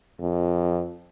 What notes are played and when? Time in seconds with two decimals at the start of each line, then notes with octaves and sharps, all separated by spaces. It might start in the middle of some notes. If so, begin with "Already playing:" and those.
0.20 F2